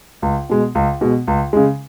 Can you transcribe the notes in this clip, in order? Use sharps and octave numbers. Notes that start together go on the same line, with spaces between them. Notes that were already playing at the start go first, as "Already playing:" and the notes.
C#2
B2 G#3
C#2
B2 G#3
C#2
C#3 G#3